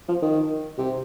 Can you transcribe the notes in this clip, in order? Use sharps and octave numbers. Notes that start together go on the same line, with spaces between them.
F3
D#3
C3